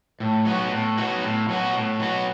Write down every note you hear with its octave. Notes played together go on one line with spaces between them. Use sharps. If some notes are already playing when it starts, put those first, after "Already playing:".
A2
F#3 B3 F#4
A2
F#3 B3 F#4
A2
F#3 B3 F#4
A2
F#3 B3 F#4